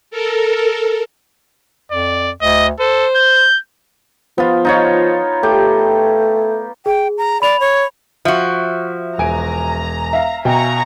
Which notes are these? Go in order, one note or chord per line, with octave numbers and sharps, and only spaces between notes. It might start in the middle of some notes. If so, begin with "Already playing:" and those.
A4 A#4
F2 D5
D2 D#5
A4 C5
G6
F3 B3 F4
D#4 F4 C#5
A3 G4
G#4 G5
A#5
D5 B5 F7
C#5
F3 F#4 E5
E1 G#5 A#5 D7
E5 F5
B2 G5 G#5 A#5 C#6